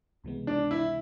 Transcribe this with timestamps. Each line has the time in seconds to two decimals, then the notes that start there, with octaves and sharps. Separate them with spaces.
0.24 C#2 C3 E3 G#3 B3
0.47 D4
0.71 E4